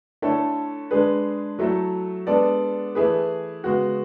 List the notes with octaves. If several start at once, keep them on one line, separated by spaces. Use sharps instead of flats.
D3 A3 E4 A4 C#5
D3 G#3 D4 G#4 B4
F#3 A3 E4 A4
G#3 B3 D4 A4 D5
E3 A3 E4 G#4 B4
C#3 G#3 B3 F#4